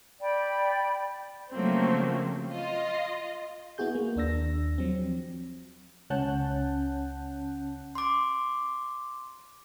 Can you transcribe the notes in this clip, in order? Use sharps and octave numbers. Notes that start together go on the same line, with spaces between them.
D5 G5 B5
C#3 F3 F#3 A3 A#3 C4
F4 D#5
B3 E4 F#4 G#4 G6
A#3
D#2 D4 E6 A#6
F3 F#3 C4
C#2 C#4 F#5 A5 F#6 G6
C6 D6